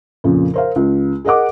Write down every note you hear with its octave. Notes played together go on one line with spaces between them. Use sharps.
F2 A#2 C#3
A#4 C5 F5
C#2
G#4 A#4 D#5 F#5 D6